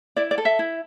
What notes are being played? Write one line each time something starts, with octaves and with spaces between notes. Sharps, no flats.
E4 D5
D5
A4
E5
E4